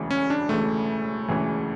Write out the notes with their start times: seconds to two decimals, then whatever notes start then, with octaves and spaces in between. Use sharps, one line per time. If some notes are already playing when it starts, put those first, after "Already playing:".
Already playing: E1 D2 C#3 E3
0.11 C#4
0.30 D4
0.49 E1 D2 C#3 E3 A3
1.28 E1 D2 C#3 E3